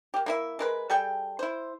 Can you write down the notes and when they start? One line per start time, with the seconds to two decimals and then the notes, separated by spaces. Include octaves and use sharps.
0.14 A#3 G4
0.26 A#3 E4 E5
0.59 G#3 A#4 B4
0.90 G3 G#4 A4 G5
1.39 E4 C5